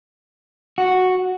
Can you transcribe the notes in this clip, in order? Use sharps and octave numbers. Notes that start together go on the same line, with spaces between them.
F#4